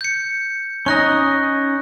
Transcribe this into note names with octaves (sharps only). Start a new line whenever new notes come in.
G6 C#7
C#4 D#4 D#5 C#6 F#6 A#6